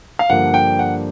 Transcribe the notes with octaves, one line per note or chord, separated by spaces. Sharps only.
F5
G2 D3 F3 A#3 F#5
G5
F#5